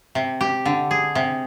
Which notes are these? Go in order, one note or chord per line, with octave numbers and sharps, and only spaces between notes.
C3
G4
D3
G#4
C3